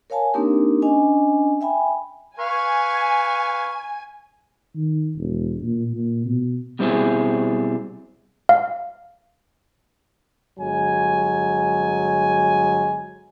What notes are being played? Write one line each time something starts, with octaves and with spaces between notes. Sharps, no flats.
A#4 C#5 F5 G#5 A5
A#3 C4 D4 D#4 G4 A#4
C#4 D4 D#5 G#5
E5 G5 G#5 B5
B4 F5 G#5 C#6
D#3
E1
A#2
A#2
B2
B2 G3 A3 C4 E4 G#4
F5
G1 F#3 G#3 G#5